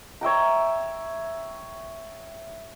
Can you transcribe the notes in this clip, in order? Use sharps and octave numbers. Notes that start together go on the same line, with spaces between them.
C#5 E5 G5 A#5